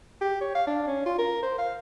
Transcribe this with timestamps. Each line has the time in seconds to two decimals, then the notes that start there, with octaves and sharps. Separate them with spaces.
0.21 G4
0.41 C#5
0.55 F5
0.67 D4
0.87 C#4
1.06 F4
1.18 A#4
1.43 C5
1.58 F5